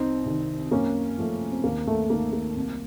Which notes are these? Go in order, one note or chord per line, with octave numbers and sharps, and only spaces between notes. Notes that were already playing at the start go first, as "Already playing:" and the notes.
Already playing: C2 C4 D#4
C3 D#3
F#2 A#3 C#4
F3 A3
C4
D#2 A#3
A3
D#3 A3 A#3
A#3
C2